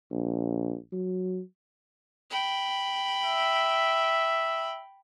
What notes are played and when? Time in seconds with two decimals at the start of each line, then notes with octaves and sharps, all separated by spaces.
0.11 A#1
0.92 F#3
2.30 G5 B5
3.24 E5